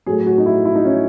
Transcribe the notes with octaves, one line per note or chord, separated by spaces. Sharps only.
A2 F#3 G#4
F#4
D#4
E4
E4
D#4
C#4